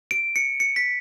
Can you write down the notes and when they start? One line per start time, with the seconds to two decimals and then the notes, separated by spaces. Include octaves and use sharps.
0.11 D7
0.36 C#7
0.60 C#7
0.76 B6